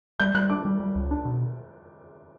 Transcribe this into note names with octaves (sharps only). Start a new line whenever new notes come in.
G3 G6
G3 F#6
D4 D6
G3
G3
C#2
D4
B2